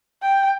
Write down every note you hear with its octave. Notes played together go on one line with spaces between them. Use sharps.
G5